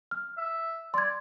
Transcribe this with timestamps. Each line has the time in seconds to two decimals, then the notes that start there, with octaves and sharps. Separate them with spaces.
0.11 F6
0.38 E5
0.94 D5 C6 G#6